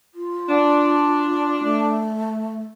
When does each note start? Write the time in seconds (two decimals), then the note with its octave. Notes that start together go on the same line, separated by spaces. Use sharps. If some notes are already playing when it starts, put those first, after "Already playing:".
0.14 F4
0.48 D4
1.63 A3